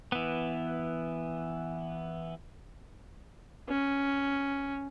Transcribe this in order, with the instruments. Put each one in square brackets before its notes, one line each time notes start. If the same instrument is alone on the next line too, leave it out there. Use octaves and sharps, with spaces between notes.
[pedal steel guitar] E3 B3
[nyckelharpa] C#4